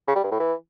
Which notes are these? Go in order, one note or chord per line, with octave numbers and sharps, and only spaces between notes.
C#3
G3
G2
A2
E3